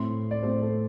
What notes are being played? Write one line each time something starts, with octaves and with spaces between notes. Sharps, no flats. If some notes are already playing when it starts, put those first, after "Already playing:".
Already playing: A2 A3 C4 C6
D5
A2 A3 C4 C5
A4